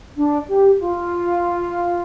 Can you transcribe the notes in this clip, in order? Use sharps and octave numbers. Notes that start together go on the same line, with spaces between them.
D4
G4
F4